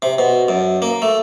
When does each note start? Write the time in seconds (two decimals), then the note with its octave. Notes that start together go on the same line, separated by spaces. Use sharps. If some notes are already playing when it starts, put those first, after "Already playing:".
0.02 C3
0.19 B2
0.48 F#2
0.82 A#3
1.02 A3